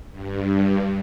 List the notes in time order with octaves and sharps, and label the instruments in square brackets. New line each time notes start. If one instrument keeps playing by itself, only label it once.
[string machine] G2